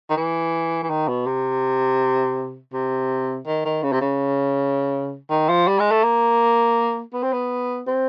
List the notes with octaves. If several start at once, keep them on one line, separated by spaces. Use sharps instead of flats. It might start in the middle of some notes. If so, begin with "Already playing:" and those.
D#3
E3
E3
D#3
B2
C3
C3
D#3
D#3
C#3
C3
C#3
D#3
F3
G3
G#3
A3
A#3
B3
C4
B3
C4